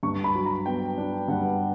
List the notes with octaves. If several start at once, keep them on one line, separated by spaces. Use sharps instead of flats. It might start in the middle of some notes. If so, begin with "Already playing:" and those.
G2 C#6
B5
F#3
A#5
B3 G5
D4
G2 F#5